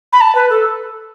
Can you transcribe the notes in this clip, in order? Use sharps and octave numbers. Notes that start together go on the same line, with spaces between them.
B5
A5
B4
A4